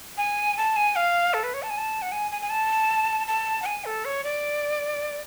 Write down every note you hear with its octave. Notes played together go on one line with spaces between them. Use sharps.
G#5
A5
G#5
F5
A4
B4
C#5
A5
G#5
A5
F#5
G#5
G#5
G#5
A5
A5
F#5
G#5
A4
C#5
D5